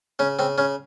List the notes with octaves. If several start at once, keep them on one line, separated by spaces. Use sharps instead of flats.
C#3 C#4
C#3 C4
C#3 C#4